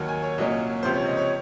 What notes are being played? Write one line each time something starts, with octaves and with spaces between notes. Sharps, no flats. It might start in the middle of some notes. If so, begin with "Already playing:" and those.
Already playing: D#2 D#3 F#3
G#5
C#5
C2 A#2 F#3 A#3 C#4 D#5
C#2 C3 F3 C5
C#5
D#5
C#5